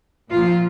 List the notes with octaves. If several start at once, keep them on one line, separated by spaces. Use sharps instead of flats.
A#2 F3 F4